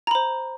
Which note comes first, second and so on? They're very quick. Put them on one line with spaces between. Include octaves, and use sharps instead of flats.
A#5 B5 C5